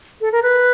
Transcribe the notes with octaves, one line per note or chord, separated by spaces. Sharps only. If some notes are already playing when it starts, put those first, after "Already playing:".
A4
A#4
B4